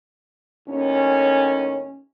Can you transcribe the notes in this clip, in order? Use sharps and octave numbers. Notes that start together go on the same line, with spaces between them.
D#2 A2 C#4